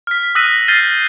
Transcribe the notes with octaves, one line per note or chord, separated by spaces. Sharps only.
F6 B6
D#6 E6 F#6 A#6 B6 D#7
F6 G6 A6 C7 D#7 G7